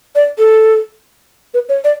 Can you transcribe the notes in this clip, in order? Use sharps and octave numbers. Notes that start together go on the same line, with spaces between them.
D5
A4
B4
C#5
D5